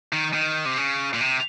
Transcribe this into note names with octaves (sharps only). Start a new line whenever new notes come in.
D#3
D#3
C3
C#3
A#2
C3